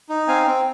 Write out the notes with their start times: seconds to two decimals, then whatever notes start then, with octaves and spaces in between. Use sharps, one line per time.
0.10 D#4
0.28 C4 F5 G#5
0.47 C4